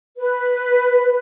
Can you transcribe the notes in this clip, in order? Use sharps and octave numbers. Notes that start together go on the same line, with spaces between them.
B4